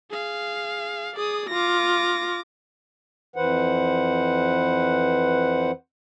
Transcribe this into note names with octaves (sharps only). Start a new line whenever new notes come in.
G#4 F5
G#4 D5 D#6
F4 D6 A#6
F2 E3 B4 C5 F#5